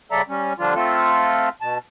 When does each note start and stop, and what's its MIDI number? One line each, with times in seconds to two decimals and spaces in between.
0.11 0.22 49
0.11 0.22 55
0.11 0.22 69
0.11 0.22 74
0.11 0.22 76
0.11 0.22 82
0.29 0.53 55
0.29 0.53 61
0.59 0.74 50
0.59 0.74 53
0.59 0.74 55
0.59 0.74 62
0.59 0.74 65
0.75 1.49 57
0.75 1.49 60
0.75 1.49 65
0.75 1.49 69
1.61 1.78 47
1.61 1.78 81